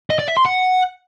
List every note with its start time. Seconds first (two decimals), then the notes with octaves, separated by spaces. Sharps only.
0.10 D#5
0.19 D5
0.28 E5
0.37 C6
0.45 F#5